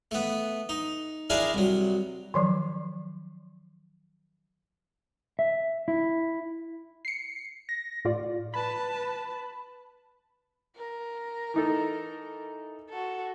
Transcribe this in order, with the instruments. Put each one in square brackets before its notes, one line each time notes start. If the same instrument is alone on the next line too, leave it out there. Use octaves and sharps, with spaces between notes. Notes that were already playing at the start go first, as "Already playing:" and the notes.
[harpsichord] A3 B3
D#4
D4 E4 G#4 A#4 D5 F5
C2 F#3
[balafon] D#3 F3 F#3
[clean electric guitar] E5
E4
[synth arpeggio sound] C7 C#7
A#6
A2 F4 D5
[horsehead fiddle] B4 A5 [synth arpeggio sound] B5
[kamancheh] A#4
[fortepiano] E3 D#4 A4
[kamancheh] F#4 A4